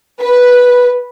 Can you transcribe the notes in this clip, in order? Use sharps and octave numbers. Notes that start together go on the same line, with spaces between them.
B4